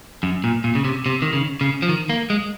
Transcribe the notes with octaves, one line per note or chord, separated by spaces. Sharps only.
F#2
A#2
A#2
C#3
C3
C3
D#3
C#3
C#3
F3
D#3
A#3
G#3